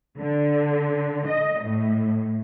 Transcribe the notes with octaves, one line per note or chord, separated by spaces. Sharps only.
D3
D#5
A2